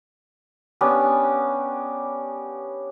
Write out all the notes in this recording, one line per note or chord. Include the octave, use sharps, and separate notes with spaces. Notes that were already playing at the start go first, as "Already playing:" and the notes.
B3 C#4 D4 G4